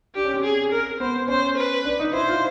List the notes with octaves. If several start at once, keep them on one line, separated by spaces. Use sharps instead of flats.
D4 G4
C#4
C4
G#4
A#4
B3 C5
C#4 C5
B4
D4
D#4
E4 C5
F4